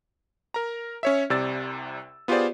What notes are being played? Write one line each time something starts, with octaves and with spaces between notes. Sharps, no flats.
A#4 A#5
C#4 C#5 E5
C2 C3 D5 E6 A6
B3 F4 G4 G#4 C5 D5